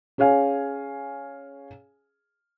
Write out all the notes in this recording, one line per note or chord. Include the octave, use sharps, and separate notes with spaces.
C#4 G#4 C#5 F5 G#5